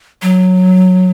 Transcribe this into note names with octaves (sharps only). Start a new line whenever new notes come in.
F#3